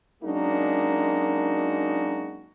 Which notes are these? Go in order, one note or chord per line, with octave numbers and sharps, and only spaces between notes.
F#2 G#3 A#3 D4 D#4 F#4